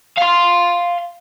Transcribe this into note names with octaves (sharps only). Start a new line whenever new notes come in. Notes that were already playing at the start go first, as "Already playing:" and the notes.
F5 C6